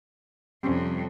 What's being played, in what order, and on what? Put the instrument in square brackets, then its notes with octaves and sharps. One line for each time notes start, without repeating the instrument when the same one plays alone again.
[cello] F2 C3 [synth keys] G3 C4 C#4